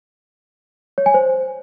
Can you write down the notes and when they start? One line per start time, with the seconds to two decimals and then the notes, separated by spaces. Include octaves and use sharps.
0.98 C#5
1.06 G#5
1.14 C5